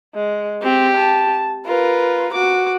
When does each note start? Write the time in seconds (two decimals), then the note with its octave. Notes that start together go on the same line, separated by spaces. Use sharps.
0.15 G#3
0.63 C4 G4
0.97 A5
1.66 F4 A#4 B4
2.33 F#4 D6